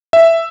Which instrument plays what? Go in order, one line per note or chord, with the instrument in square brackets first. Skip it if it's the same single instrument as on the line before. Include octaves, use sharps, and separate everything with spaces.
[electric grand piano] E5